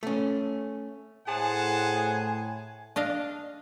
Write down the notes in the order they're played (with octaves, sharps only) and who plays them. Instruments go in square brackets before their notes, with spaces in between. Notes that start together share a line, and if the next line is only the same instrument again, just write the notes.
[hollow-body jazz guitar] A3 C#4
[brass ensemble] A2 [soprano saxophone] G#4 [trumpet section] C5 F#5 A5 [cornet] G#5
[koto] D4 D#5 F5